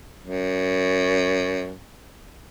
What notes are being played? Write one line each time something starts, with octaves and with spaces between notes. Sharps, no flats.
F#2